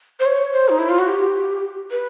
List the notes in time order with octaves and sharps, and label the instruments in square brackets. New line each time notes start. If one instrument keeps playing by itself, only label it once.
[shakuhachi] C5
C#5
C5
D#4
E4
F4
F#4
G4
B4